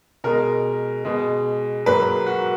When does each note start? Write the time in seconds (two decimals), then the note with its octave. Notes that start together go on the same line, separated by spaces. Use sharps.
0.24 B2 G#3 A#4
1.05 B2 G#3
1.86 G#2 F#3 A#3 B4
2.27 F#4